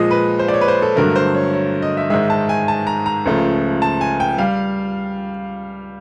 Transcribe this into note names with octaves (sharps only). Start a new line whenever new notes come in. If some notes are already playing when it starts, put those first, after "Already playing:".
Already playing: A#2 F3 G#3 D#5
B4
C5
D5
C#5
B4
C5
A4
G2 D3 F#3 A3 A#4
C5
C#5
C#5
D#5
E5
G#2 D#3 G#3 E5
A5
G#5
A5
A#5
A#5
C#2 C#3 F3 A3
A5
G#5
G5
G3 F5